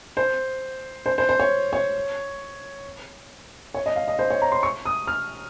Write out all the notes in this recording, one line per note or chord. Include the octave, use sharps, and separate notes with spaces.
C5
C5
C5
C5
C#5
C#5
C#5
D#5
F5
D#5
C5
C#5
A#5
C6
C#6
D#6
F6